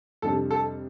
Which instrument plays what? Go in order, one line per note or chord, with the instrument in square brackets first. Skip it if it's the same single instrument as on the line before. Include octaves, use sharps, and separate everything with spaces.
[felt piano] F2 C3 G3 D4 [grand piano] A4
[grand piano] A4